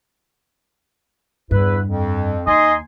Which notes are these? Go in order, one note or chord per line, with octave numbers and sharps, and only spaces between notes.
E2 G2 E4 B4
F2
D#2 D#4 D#5 G#5 C6